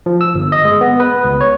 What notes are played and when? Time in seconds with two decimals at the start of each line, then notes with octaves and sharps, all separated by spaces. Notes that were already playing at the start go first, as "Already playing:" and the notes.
0.06 F3
0.21 E6
0.34 G1
0.52 D#5
0.65 G#3
0.81 B3
1.00 B4
1.25 C#2
1.41 C#5